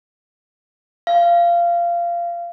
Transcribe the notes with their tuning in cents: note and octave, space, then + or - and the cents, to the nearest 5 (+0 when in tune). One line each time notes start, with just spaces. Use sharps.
F5 -20